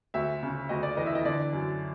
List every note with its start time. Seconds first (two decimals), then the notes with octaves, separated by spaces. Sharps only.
0.14 D2 E5
0.43 C#3
0.69 D2 D#5
0.83 D5
0.97 E3 D#5
1.06 E5
1.15 D#5
1.25 D3 D5
1.53 F#2